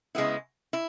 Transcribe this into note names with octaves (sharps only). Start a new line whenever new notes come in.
C#3 G#3 B3 E4
E4